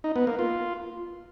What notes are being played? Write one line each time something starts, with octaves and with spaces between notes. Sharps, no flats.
D#4
B3
A#3
F4